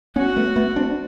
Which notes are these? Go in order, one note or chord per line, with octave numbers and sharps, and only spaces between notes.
B3 C#4 F#4
A3 B3
A3 B3
C4 D4